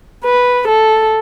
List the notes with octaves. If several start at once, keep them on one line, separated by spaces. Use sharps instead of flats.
B4
A4